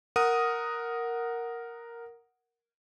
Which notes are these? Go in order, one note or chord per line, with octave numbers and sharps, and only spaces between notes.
A#4 F#5 D#6 D#7